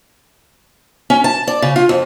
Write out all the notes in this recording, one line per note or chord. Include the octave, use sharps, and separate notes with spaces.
C#4
A5
D5
C#3
F4
F2